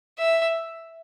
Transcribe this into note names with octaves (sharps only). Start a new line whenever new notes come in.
E5